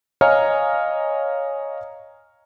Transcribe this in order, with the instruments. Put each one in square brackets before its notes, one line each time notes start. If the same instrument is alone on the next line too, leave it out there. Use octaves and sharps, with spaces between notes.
[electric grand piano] C#5 D#5 F5 G#5 A#5 F6